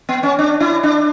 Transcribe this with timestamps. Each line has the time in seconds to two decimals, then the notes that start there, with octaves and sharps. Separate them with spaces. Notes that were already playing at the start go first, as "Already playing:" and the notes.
0.09 B3
0.23 C#4
0.39 D4
0.60 E4
0.83 D4